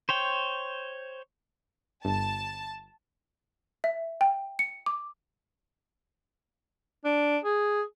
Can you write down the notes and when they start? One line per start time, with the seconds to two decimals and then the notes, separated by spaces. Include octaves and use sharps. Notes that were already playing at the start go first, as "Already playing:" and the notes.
0.09 C5 C#5 G5
2.05 G1 A5
3.84 E5
4.21 G5
4.59 C#7
4.86 D6
7.05 D4
7.45 G#4